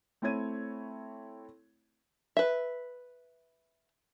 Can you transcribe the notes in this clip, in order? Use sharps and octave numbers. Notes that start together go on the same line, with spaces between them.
A3 C4 E4 C#5 G#6 D#7
B4 E5